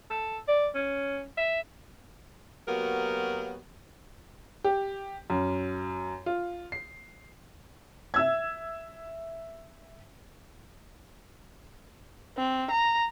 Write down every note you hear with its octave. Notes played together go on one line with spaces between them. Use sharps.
A4
D5
C#4
E5
F#3 A#3 B3 F#4 G4 A#4
G4
F#2
F4
C7
E5 E6 G#6
C4
A#5